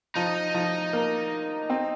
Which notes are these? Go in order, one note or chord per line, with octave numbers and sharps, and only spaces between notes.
F3 D#4
F3
A#3
C4